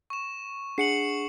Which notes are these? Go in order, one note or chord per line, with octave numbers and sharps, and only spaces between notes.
C#6 E7
D4 G#4 F#5 C7 C#7 F#7